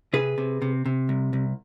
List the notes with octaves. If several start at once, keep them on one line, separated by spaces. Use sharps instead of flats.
C3 G#4 B4
C3
C3
C3
C2
C2